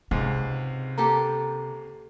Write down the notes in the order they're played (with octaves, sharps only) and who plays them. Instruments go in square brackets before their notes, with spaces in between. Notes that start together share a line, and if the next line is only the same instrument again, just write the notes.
[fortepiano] C#2 G#2 [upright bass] C3
[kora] A#3 G4 A4 [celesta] A#5